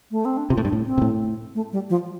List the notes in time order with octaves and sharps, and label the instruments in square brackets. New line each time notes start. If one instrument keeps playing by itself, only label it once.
[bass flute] A3
C4
D4
[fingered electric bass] C3 [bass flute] F4
[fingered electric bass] A2
G2
[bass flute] D4
[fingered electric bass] A2
[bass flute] C4
[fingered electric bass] C3
A2
[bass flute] A3
G3
F3